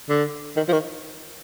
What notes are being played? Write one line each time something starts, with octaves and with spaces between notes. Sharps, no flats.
D3
D#3
F3
D#3